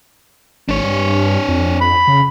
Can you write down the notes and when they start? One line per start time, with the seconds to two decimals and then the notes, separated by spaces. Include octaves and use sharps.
0.69 G#1 D4 C#5
0.84 G2
1.48 F2
1.81 B5
2.07 C#3